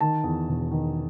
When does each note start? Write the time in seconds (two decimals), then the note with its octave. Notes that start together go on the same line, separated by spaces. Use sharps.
0.01 D#3 A5
0.24 E2
0.49 E1
0.71 D#3